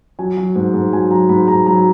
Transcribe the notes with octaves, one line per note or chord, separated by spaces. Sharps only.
F#3 G#5
F#3
G#2
G#2
F#3 G#5
F#3 A#5
G#2 B5
G#2 A#5
F#3 A#5